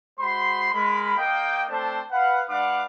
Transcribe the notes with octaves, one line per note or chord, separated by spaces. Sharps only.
G#3 F#4 C5 B5 C6
G#3 A#4 B5
A#3 D#5 G5
A3 C4 D4 C5 A5
B4 F5 F#5
G#3 D4 B4 F5 F#5 D6